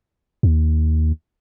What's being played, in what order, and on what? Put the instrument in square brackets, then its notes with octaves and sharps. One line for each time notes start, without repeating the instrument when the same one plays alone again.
[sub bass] D#2